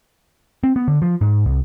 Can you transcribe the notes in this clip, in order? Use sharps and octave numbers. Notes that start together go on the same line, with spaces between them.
C4
B3
D3
F3
G#2
C2